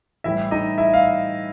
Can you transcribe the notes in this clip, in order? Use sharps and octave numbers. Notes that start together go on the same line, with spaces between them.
A2 E3 G3 E4 E5
D#4 D#5
E4 E5
F5